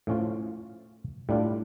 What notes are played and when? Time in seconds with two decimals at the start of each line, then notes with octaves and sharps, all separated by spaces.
0.07 A2 F3 C#4 F4
1.29 A2 G3 D4 F4